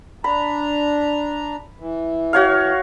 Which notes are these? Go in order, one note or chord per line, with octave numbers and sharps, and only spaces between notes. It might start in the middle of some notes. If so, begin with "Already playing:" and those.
D4 A#5 B5
E3
F#4 C#5 F5